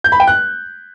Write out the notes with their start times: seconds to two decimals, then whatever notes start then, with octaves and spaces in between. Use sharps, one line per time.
0.04 G6
0.12 B5
0.20 G5
0.27 F#6